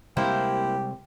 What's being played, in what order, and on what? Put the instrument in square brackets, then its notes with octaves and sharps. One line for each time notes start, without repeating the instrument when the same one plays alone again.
[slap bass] C3 G3 G#3 [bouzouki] A#3 E4 C5 [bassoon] G4